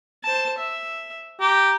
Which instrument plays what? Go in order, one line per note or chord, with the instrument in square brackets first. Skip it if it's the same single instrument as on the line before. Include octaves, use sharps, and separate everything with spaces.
[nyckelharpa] C5 A5
E5
[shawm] G4 [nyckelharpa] A#5